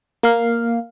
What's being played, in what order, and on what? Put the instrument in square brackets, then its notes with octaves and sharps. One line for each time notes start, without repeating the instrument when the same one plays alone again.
[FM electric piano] A#3 F5